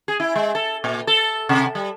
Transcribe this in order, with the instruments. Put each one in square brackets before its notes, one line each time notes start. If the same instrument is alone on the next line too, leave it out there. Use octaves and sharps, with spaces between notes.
[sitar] G#4
E4
G#3
A4
A#2
A4
C3
G3